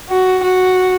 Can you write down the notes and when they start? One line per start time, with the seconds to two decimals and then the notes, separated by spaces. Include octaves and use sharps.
0.10 F#4
0.43 F#4